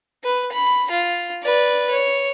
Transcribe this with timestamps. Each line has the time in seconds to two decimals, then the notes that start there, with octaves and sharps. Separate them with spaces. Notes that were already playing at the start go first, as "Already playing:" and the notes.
0.24 B4
0.52 B5
0.91 F4
1.43 B4 D5
1.91 C#5